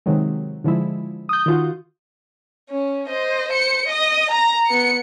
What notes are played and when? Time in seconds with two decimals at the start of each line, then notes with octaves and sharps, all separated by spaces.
0.06 C3 D#3 F#3 G#3
0.64 D3 F3 G#3 E4
1.29 D#6 G6
1.46 D#3 F4 F#4
2.70 C#4
3.08 C5 D#5
3.48 C5 C#7
3.88 D#5 D#6
4.31 A#5 A#6
4.67 B3 C#7